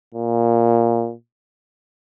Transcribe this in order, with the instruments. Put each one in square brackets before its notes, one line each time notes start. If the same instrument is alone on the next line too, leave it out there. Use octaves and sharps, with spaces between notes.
[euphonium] A#2